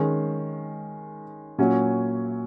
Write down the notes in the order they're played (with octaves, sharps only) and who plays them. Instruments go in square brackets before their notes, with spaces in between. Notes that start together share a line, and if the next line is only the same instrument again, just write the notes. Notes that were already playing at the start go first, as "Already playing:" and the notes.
Already playing: [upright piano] D#3 G#3 C#4
A#2 F#3 C#4 G#5